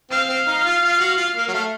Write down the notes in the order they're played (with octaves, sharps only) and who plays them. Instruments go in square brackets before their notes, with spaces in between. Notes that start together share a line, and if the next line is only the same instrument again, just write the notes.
[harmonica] C4 [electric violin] F5
[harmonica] C4
D#4
F4
F4
F#4
F4
A#3
F#3
A3